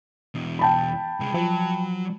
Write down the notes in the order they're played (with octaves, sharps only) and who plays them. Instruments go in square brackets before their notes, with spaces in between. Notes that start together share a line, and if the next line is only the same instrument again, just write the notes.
[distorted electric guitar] E2 B2
[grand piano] G5 A5 B5
[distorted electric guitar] C2 G#3
[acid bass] F3 [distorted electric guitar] F#3